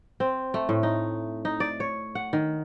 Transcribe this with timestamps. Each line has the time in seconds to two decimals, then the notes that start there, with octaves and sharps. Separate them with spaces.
0.20 C4
0.54 A3
0.69 A2
0.83 D#4
1.45 D#4
1.60 D5
1.80 C#5
2.15 F#5
2.33 D#3